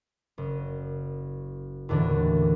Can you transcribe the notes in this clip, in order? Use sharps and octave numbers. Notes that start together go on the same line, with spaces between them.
F#1
D#2 A2 D3 E3 D4